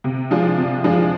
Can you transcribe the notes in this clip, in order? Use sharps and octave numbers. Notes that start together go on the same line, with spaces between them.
C3
F3 G#3 D4 F4
C3
F3 G#3 D4 F4